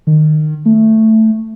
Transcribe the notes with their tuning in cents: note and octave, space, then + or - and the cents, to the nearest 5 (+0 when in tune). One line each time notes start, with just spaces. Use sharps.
D#3 -20
A3 +5